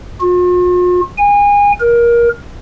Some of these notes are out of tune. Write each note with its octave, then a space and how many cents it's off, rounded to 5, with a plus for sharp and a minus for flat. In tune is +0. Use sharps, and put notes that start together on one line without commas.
F4 +45
G#5 -30
A#4 +20